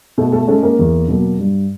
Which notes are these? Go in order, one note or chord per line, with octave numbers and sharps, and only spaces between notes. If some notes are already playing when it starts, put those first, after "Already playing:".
B2 A3 A4
A3 A4
G#3 A3 C#4 A4
A#3 A#4
E2
B2 F#3 A#3
G2